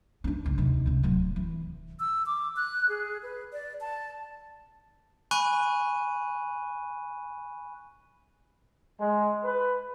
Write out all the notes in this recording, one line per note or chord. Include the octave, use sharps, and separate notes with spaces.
C#4 D4
G#1 C#2
D#2 C3
C#2 C3
D1 F#3
E3
E6
D6
F#6
G#4
B4
D5
A5
G#5 B5 C#6 F#6 D#7
G#3
B4